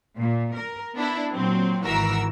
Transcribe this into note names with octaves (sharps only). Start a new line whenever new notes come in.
A#2
A#4
B3 D4 E4
A#2 F#3 C4
G#1 E3 F#4 A#4 E6